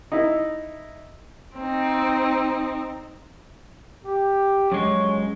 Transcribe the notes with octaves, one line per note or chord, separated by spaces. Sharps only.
D#4 E4
C4 D#4
G4
F#2 G#3 C#5